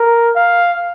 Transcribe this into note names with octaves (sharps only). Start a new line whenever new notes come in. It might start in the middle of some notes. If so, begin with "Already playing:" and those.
Already playing: A#4
F5